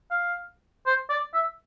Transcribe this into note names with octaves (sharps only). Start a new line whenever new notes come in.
F5
C5
D5
E5